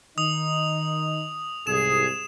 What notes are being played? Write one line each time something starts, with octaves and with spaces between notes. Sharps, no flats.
D#3 D#4 D#6 F7
C2 G#2 G#4 E7